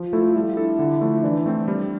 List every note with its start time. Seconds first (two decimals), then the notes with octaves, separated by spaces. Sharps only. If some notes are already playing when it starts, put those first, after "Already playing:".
Already playing: F3 F4
0.13 A3 E4 A4
0.35 G3 E4
0.57 D4 A4
0.79 D3
1.01 F3 A3 D4
1.24 E3 D4
1.46 A3 C4
1.68 G3